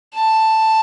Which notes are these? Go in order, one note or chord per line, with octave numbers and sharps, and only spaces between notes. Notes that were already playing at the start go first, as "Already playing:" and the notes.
A5